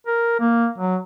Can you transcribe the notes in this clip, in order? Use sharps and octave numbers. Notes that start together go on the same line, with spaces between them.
A#4
A#3
F#3